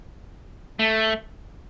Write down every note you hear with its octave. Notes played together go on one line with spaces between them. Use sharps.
A3